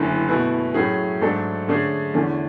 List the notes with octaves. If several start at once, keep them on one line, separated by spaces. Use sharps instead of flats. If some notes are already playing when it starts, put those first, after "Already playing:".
Already playing: F#1 F#2 D3 A3 E4
B2 A3 E4 B4
A2 F#3 A3 C#4 G#4
G#2 F#3 A3 D4 A4
D3 A3 C#4 G#4 D5
E2 D3 A3 C#4